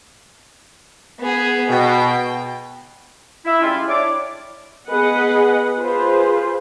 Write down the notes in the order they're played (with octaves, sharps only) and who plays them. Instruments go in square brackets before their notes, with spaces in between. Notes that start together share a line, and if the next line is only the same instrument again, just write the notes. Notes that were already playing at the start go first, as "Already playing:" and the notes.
[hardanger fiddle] B3 G#4
[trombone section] B2 [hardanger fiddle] G5
[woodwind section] E4
G3 G#3 C#4 E4 F4
D4 E4 C#5 D5 D6
[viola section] B3 G#4 B4 D#5 F#5
F4 G#4 B4 C5